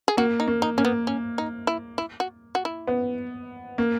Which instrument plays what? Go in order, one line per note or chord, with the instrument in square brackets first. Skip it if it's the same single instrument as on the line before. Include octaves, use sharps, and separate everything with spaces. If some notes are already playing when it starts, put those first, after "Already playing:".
[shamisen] G#4
[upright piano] A#3 [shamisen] F#4
[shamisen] D#4
[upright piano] A#3
[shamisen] D#4
[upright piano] A#3 [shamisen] C#4
[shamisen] B3
C#4
D#4
E4
E4
F#4
F#4
E4
[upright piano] B3
A#3